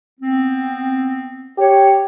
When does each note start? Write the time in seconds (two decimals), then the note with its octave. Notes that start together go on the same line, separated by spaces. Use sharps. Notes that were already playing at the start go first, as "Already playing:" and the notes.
0.20 B3 C4
1.58 G4 C#5